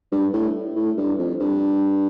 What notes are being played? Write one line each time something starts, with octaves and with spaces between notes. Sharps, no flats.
G2
A2
A2
G2
F2
G2